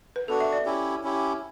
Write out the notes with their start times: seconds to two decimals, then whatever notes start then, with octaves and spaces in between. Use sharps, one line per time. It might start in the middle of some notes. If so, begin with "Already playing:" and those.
0.16 B4
0.28 B3 D4 F#4 A4
0.40 E5
0.53 D5
0.65 C#4 E4 G4
1.04 C#4 E4 G4